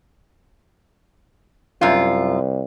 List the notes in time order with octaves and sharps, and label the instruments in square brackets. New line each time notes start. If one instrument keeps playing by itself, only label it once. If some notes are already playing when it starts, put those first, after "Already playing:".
[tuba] C2 [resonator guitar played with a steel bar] F#2 F4